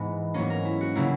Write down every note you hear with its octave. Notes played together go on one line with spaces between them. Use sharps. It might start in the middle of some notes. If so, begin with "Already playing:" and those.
Already playing: G#2 E3 G#3 B3
G#2 F#3 A#3 C#4
A#4
E4
F#4
C#3 F#3 A#3 E4